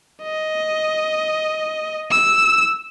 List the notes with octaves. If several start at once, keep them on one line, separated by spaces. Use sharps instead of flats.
D#5
E6